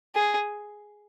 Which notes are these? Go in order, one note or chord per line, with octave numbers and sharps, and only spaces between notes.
G#4